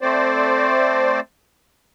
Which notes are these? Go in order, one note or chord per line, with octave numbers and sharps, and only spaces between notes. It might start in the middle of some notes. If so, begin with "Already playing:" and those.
A3 C4 C5 D5